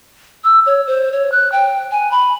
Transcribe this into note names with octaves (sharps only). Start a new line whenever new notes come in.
E6
C#5
C5
C#5
F#6
G5
G#5
B5